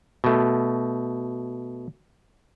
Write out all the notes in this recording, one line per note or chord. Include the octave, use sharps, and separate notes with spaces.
B2 A3